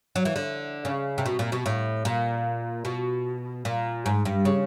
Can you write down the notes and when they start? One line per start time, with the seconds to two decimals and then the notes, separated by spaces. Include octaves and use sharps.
0.16 F#3
0.25 E3
0.36 D3
0.85 C#3
1.18 C3
1.26 B2
1.39 A#2
1.52 B2
1.66 A2
2.05 A#2
2.85 B2
3.65 A#2
4.06 G#2
4.25 G2
4.45 C#3